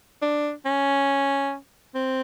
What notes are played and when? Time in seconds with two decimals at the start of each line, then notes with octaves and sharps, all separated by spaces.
0.22 D4
0.65 C#4
1.95 C4